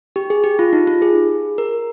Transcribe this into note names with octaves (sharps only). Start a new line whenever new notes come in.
G4
G#4
G4
F4
D#4
F4
G#4
A#4